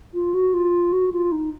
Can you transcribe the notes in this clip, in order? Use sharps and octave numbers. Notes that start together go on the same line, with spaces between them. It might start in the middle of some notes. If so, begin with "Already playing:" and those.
F4
F#4
F4
F#4
F4
D#4